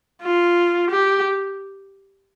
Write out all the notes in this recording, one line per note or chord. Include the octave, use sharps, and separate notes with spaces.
F4
G4